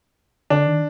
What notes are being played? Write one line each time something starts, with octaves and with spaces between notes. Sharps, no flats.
D3 D4
D#3